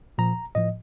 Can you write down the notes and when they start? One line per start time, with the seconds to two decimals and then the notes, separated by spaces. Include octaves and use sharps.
0.18 A#2 F3 A#5
0.55 A2 F3 D#5